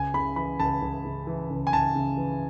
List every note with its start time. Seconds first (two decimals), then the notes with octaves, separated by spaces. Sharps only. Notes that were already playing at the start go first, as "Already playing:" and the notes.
Already playing: C#2 G#5
0.14 C#3 B5
0.36 E3 B5
0.60 C#2 A5
0.82 C#2
1.05 C#3
1.27 E3
1.50 C#2
1.67 G#5
1.73 C#2 A5
1.95 C#3
2.17 E3